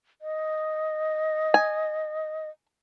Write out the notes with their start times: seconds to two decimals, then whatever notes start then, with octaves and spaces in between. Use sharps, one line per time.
0.22 D#5
1.54 G#5